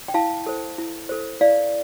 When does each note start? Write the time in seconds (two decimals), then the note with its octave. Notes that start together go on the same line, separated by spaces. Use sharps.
0.08 G5
0.14 E4 F5 A5
0.46 A4 C5
0.78 E4
1.09 A4 C5
1.41 E4 D5 F5